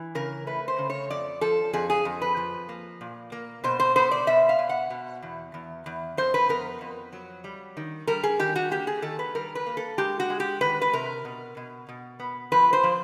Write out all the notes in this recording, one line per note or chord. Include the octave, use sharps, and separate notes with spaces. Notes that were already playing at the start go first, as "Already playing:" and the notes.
Already playing: E3
C#3 A#4
A3 B4
C5
C#3
C#5
F2 D5
F3 A4
F2 G#4
G#4
F2
B4
F3
A#3
A#2
A#3
B2 C5
C5
B3 C5
D5
B2 E5
F5
B2
F#5
B2
E2
E2
E2
F2 C5
B4
B3 A#4
F2
F#3
G3
D#3
G3 A#4
G#4
D#3 G4
F#4
A#3 G4
G#4
D#3 A4
B4
G3 A#4
B4
A#3
A4
G#3 G4
F#4
G#3
G4
D#3 B4
B4
C3 A#4
B2
B2
B2
B3
F3 B4
C5
F3